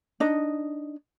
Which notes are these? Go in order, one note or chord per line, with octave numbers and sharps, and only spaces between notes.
D4 D#4 D#5